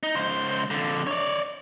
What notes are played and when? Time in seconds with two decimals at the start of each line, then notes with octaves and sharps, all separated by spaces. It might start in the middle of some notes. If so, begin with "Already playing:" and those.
0.03 D#4
0.15 C#2 C5
0.70 F2 D3
1.07 C#5 D5